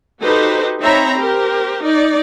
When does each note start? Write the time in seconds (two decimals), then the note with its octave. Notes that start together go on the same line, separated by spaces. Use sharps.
0.22 D#4 F#4 G4 A4 B4 C5
0.80 C4 D#4 C#5 E5 A#5 B5
1.19 G4 A#4 C5
1.84 D#4 D5